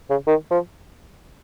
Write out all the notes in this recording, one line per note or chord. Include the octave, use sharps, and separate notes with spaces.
C#3
D#3
F3